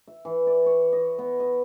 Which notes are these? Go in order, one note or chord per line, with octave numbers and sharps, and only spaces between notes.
E5
E3
D5
C#5
D#5
B3
D#5